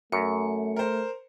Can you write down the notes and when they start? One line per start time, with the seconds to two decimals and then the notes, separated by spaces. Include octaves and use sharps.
0.12 F#2 A3 C#7
0.76 A#4 C5